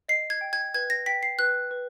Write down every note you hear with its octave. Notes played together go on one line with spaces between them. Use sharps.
D#5 C7
G#6
G5
G#6
B4 G#6
A#6
G5 B6
C7
B4 F#6
B4